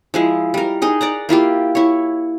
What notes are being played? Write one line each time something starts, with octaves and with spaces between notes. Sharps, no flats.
F3 G#3 E4
G3 A#4
D#4 G#4 D#5
D5 F#5 A#5
A#3 E4 F4 G4
E4 C#5